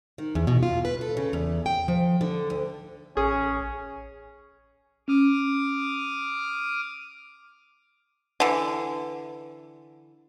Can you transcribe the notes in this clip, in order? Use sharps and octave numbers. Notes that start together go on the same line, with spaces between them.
D#3
E2
B2
F4
B4
A4
C#3
E2
G5
F3
D3
D2
A1 C#4 G#4
C#4 D6 D#6 F6
D3 E3